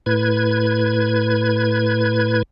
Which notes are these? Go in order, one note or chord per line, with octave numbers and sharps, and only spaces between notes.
A2 B4 G#6